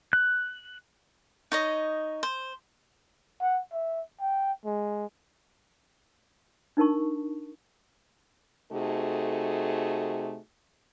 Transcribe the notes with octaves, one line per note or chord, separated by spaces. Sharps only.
F#6
D#4 C#5 D#5
C5
F#5
E5
G5
G#3
D4 D#4 A#4 A5 C#6
C3 A3 D#4 F#4 G#4 A4